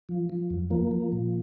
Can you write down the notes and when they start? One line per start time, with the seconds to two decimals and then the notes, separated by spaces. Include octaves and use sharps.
0.09 F3
0.30 F3
0.50 F2
0.70 F3 A#3
0.91 F3
1.12 A#2